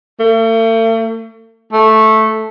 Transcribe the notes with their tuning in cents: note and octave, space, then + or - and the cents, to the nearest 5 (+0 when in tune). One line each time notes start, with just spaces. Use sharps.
A3 +45
A3 -5